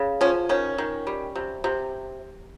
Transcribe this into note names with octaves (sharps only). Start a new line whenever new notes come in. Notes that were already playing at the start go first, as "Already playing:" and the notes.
Already playing: C#3
F3 C#4
D#3 C#4
D#3
G3
C3
C3